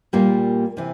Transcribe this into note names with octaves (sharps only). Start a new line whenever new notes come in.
A#2 G3 A#3 F4
C3 E3